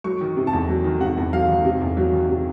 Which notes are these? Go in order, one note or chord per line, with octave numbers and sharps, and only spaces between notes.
F#3 C#6
D#3
C3
A5
E2
F#3
D#3
C3 F#5
E2
F#3 F5
D#3
C3
E2
F#3
D#3
C3